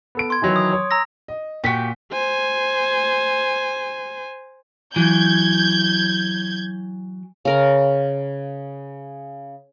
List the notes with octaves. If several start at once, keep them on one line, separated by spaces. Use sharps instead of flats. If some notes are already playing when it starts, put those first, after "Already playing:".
B3 A4 D7
C6 G#6
D#3 E3 F#3
D#6
C#5
A#5 E6 A#6
D#5
A#2 F#4 G4 B6
C5 G#5
E3 F#3 G6 G#6
C#3 A#4 F5